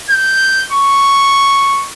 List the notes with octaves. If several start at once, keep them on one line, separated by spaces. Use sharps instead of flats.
G6
C#6